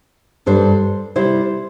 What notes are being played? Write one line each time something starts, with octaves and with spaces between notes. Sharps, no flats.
G2 G3 D4 A4 C5
C3 G3 E4 C5